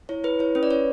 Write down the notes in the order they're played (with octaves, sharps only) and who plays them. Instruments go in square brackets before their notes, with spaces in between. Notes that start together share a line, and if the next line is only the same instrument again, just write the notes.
[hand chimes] E4 C#5
E4 B4
E4 C#5
C#4 B4
D5
C#4 C#5